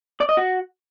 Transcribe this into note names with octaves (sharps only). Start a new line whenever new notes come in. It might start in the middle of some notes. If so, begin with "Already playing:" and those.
D5
D#5
F#4